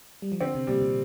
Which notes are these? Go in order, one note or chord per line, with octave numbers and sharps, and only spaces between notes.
G3
F3
D3 C4
C3
A#2 G3
A#2